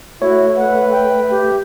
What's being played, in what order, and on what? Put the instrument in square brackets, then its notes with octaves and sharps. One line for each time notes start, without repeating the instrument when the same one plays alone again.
[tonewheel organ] A3 [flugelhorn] E4 [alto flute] F#4 [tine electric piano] C#5
[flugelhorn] B4 [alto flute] F#5
[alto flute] G5
G4